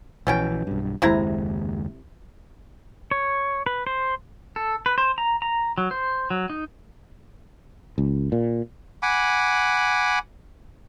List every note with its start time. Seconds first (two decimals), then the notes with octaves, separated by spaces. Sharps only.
0.27 A#1 B2 E3 C#4 G5
0.67 B1 G2
1.02 F#1 D#2 C3 G#3 E4 A#5
3.11 C#5
3.66 B4
3.87 C5
4.56 A4
4.86 B4
4.98 C5
5.18 A#5
5.42 A#5
5.78 F#3
5.91 C5
6.30 F#3
6.50 D#4
7.98 C#2
8.32 A#2
9.03 F#5 G#5 B5 D6